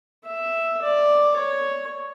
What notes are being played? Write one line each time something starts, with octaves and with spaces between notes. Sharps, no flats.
E5
D5
C#5